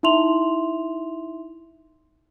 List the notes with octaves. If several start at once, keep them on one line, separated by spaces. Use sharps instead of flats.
D#4 E4 E5 C6 F7 F#7